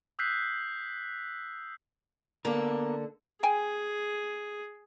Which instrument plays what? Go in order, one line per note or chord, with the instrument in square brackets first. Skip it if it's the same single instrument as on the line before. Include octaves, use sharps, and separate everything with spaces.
[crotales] D#6 E6 F#6 G6 B6 C7
[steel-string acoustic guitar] D3 A#3 A4 [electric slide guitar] B3 A#4
[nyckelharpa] G#4 [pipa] G5 G#5